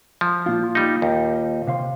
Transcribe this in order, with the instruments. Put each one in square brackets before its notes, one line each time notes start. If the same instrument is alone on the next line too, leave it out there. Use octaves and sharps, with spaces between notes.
[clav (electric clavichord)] F3
[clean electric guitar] A#2 F4
[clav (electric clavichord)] G3 D#4
D#2
[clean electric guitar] C3 F5 C6